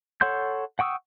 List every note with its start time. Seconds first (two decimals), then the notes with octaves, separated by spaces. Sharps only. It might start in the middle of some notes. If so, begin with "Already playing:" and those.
0.21 A4 C#5 F#5 C6 G6
0.79 F#5 G5 C#6 D#6 E6